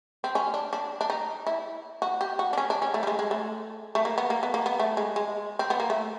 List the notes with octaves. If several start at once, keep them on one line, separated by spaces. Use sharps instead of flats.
C4
C#4
D4
D4
D4
D#4
E4
F#4
G4
F#4
D4
C#4
D4
C#4
A3
G3
G#3
G#3
A3
A3
A#3
B3
A#3
B3
A#3
B3
A3
G#3
G#3
C4
B3
A#3
A3